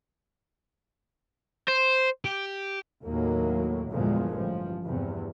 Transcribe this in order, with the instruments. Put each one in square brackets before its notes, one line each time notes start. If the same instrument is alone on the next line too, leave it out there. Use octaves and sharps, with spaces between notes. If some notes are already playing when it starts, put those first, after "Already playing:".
[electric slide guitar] C5
[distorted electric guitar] G4
[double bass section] D#2 A2 F#3 A#3
E2 G2 A#2 D3 F3 G#3
A1 G2 F3
E2 G2 C3